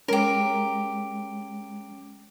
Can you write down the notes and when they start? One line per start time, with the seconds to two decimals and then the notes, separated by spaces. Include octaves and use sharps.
0.08 G#3 C#4 G4 A#4